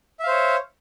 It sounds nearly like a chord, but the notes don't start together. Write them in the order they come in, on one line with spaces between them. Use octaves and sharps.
E5 F5 C5 C#5